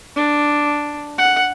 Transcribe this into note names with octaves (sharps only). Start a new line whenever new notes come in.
D4
F#5